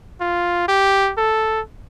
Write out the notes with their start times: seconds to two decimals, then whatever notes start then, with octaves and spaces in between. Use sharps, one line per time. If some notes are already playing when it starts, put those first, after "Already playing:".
0.20 F4
0.68 G4
1.17 A4